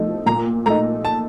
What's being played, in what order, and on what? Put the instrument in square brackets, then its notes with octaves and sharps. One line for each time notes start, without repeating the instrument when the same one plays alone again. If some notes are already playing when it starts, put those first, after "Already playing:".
Already playing: [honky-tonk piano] F3 A3 D#4
[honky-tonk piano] A#2 [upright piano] A#5
[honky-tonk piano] A3 D#4 [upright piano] A#5
[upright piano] A5